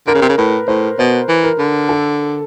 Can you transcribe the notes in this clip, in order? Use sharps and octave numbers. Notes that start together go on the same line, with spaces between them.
D3 A#4
C#3
C3
C#3
A2 B4
A2 C5
B2 C5
E3
A#4
D3
A4